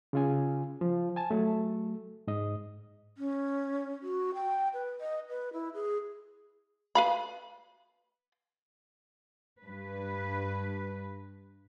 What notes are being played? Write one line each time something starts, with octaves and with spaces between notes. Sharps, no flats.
C#3 F4 G#5
F3
G#5 A5
F#3 A3
G#2 D#5
C#4
F#4
G5
B4
D#5
B4
E4
G#4
B4 F5 B5
G2 B4